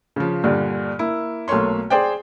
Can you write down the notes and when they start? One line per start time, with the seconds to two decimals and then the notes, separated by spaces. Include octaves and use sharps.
0.16 C#3 F3
0.44 G2 A#2 D3
0.99 A#3 E4
1.48 B1 A3 A#3 C#5 C6
1.90 G#4 C5 D5 G5